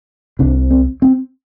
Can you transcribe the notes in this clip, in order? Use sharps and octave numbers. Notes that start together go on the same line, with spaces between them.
C2 C3 D4
C4
C4